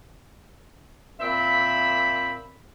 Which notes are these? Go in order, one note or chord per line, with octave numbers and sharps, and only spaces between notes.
A#2 C4 E5 B5